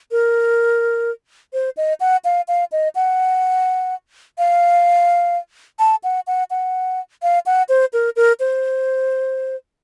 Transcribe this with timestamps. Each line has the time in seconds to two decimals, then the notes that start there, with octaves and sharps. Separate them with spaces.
0.11 A#4
1.53 C5
1.77 D#5
2.00 F#5
2.25 F5
2.48 F5
2.72 D#5
2.95 F#5
4.38 F5
5.79 A5
6.04 F#5
6.27 F#5
6.50 F#5
7.22 F5
7.46 F#5
7.69 C5
7.93 A#4
8.16 A#4
8.40 C5